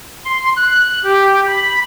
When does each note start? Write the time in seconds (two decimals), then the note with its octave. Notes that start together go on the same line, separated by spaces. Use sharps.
0.25 C6
0.56 F#6
1.04 G4
1.47 B5